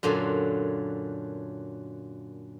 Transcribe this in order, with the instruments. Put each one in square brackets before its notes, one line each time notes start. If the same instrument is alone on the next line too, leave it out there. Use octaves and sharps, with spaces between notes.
[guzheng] F#2 A#2 D3 F#3 C6